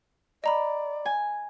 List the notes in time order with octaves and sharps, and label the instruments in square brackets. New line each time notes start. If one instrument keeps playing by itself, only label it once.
[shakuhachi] D5 [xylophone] D#5 A#5 B5
[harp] G#5